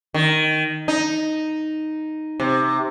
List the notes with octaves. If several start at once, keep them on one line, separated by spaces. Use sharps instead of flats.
D#3
D#4
C3